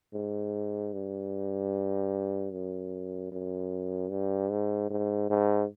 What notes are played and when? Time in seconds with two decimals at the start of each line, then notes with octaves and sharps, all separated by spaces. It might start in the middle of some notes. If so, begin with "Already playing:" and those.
0.13 G#2
0.93 G2
2.53 F#2
3.32 F#2
4.11 G2
4.51 G#2
4.90 G#2
5.30 G#2